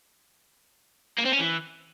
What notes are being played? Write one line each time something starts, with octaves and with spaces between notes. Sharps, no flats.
A#3
C4
C#4
E3